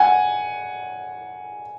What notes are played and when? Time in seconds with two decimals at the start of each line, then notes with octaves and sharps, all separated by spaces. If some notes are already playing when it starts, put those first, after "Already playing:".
Already playing: F#5 G#5